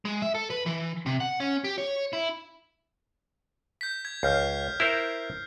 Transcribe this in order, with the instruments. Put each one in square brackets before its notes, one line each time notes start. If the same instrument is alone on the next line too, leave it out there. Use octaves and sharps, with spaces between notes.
[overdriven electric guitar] G#3
E5
A4
B4
E3
C3
F#5
C#4
G4
C#5
E4
[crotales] G6 B6
G#6
[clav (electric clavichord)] C#2 [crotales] F6 G6 C7
[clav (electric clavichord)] E4 A#4 C5